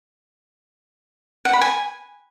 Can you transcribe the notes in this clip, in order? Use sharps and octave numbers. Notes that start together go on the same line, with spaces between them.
F#5
B5
G#5